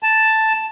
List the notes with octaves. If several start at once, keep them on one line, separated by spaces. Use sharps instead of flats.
A5